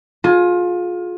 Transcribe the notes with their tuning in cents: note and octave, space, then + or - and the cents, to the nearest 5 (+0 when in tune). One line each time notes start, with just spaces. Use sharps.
F4 +25 G#4 +25